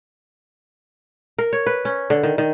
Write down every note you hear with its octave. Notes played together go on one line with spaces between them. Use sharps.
A#4
C#5
B4
C#4
D3
D#3
D#3